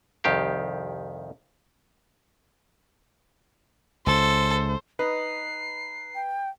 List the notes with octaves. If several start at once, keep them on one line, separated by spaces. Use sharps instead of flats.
C2 F2 D#3 G4 F5
C#2 A4 C5
D#4 B4 C7
G5